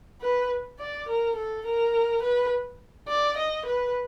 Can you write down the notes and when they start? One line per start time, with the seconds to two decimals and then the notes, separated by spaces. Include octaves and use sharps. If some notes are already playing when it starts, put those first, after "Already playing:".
0.22 B4
0.80 D5
1.08 A#4
1.36 A4
1.66 A#4
2.22 B4
3.08 D5
3.37 D#5
3.66 B4